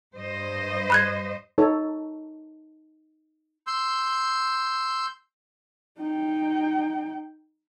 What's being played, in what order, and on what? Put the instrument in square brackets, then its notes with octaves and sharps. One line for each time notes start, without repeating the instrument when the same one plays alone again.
[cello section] G2 C5 D#5
[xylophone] B5 F#6 G#6
[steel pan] D#4 A4 C#5
[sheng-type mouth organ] C6 E6 G6
[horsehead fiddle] D#4 G5